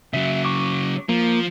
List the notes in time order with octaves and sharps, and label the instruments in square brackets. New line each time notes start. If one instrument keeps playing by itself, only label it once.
[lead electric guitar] C#3 F#3 [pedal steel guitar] E5
[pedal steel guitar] C#6 D6
[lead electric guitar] F3 [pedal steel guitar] A#3